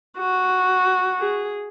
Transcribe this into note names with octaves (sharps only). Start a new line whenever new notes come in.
F#4
G#4